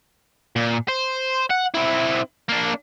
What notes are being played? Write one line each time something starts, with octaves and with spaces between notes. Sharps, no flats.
A#2
C5
F#5
C4 E4
A#3 D4